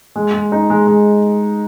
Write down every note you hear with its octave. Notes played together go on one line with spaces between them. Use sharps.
G#3
G#3
D#4
G#3
G#3